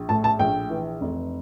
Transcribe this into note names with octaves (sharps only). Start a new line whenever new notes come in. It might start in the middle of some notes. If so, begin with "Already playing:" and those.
Already playing: A#1
A2 A5
A5
A#1 G5
E3
F1